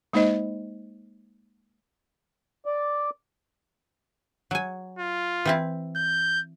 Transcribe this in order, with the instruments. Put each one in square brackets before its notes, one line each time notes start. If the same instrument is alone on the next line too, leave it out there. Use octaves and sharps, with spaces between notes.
[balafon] G#3 A#3 D#4 C5 D#5
[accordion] D5
[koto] F#3 G#5
[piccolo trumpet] F4
[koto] E3 C4 E4
[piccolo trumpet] G6